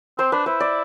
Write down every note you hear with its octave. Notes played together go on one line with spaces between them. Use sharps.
C4 C5
D4 B4
E4 C5
D5